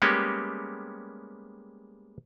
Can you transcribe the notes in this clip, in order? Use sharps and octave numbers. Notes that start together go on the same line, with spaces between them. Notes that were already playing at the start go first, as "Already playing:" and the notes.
G3 G#3 A#3 B3 C#4 G4